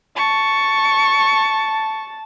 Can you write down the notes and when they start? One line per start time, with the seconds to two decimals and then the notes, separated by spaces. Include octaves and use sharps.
0.16 A5 C#6